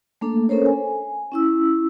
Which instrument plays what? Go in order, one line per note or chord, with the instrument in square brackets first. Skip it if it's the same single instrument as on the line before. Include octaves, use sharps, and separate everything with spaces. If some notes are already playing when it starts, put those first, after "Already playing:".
[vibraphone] A3 A#3 D4 A4
C#4 A4 A#4 C5 C#5
G#5
C#4 E4 E6